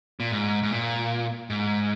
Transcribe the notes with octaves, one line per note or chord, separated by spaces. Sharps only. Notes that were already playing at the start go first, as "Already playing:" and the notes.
A#2
G#2
G#2
A#2
G#2